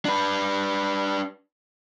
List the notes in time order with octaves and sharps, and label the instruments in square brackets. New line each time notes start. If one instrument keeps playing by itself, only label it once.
[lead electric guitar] D4 B4